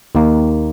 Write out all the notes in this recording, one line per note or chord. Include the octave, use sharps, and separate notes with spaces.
D#2 D#3 A#3